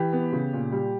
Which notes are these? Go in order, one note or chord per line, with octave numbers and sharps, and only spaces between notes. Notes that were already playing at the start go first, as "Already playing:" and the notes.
Already playing: E3 G4
B3
C#3
A#2
G3